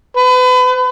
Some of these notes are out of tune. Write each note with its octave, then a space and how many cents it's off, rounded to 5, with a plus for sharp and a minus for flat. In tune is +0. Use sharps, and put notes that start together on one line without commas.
B4 +35